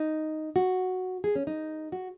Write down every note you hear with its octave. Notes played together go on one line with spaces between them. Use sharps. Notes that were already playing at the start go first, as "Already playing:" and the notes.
Already playing: D#4
F#4
G#4
C#4
D#4
F#4